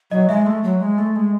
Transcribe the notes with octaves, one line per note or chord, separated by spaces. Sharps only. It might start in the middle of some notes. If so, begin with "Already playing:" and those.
F#3 D#5
G#3 E5
A3
F#3
G#3
A3
G#3